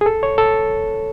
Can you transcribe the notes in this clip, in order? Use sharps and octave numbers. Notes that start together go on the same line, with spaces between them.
G#4
A4
C#5
A4